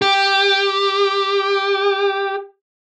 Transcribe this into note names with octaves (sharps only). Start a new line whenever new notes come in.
G4